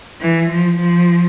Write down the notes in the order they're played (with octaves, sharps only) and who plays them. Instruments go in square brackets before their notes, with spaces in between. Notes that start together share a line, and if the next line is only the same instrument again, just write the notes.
[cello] E3
F3
F3